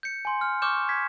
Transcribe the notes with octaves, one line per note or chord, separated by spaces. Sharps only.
G6 C#7
G#5 C6
F6
C#6 D6 F6 G6 E7
G#6 B6